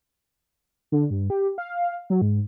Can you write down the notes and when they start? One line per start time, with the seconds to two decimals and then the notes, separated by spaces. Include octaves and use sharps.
0.92 D3
1.10 G2
1.30 G4
1.58 F5
2.10 F#3
2.22 G#2